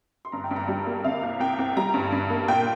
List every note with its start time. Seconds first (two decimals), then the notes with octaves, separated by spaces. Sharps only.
0.25 C6
0.32 G2 A#5
0.44 G5
0.51 G2
0.56 A#5
0.68 G3 A#5
0.87 A#3
1.04 C3 F5
1.23 C2
1.40 C2 G5
1.58 C2
1.77 G3 A#5
1.94 G2
2.12 G2
2.30 A#3
2.48 A#2 G5